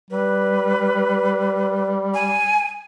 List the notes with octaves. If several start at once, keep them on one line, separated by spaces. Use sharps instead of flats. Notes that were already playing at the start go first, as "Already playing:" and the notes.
G3 B4
G#5